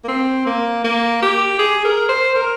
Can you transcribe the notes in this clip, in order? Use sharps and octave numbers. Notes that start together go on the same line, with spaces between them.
A#3
C4
A#3
A#3
G4
G#4
A#4
C5
A#4